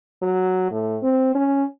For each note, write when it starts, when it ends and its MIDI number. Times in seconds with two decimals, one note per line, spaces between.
0.22 0.66 54
0.71 0.97 45
1.03 1.32 60
1.35 1.64 61